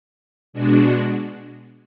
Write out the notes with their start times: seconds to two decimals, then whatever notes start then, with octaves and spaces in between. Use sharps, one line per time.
0.53 B2 G#3 D4 F#4